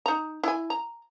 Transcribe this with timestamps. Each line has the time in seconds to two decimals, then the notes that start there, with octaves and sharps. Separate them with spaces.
0.06 D#4 A#5
0.43 E4 G#5
0.70 A#5